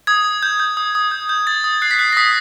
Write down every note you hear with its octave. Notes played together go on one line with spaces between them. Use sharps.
D#6 G#6
D#6
G6
G6
D#6
D#6
G6
G6
D#6 A6
D#6
F#6 C7
B6
F#6 C7
A#6
D#6 B6